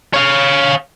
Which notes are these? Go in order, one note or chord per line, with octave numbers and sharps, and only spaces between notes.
C#5 F5